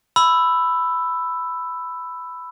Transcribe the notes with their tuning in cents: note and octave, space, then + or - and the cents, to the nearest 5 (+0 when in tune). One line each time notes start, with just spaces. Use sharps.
B5 +10 E6 +5